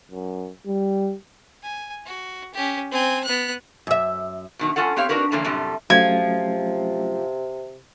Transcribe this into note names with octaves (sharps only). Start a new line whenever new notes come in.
F#2
G3
G#5
F#4
C#4 G4
C4 G#5
B3 F#6
F#2 E5
B2 D#3 F#3
G2 C#4 F4 A4 F#5
B3 C4 G4 C#5 F5
C4 D4 D#4 F#4 A#4 B4
D3 E3 F3 A3 A#3 C#4
F#2 A2 C3 G3 A3
C3 F3 F#3 A3 C#4 G#6